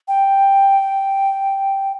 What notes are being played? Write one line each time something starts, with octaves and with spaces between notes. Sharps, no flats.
G5